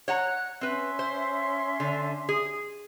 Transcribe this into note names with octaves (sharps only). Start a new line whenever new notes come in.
C#5 F#5 A#5 F#6
C4 C#4 B4 E5 C6
C5
D3
G#4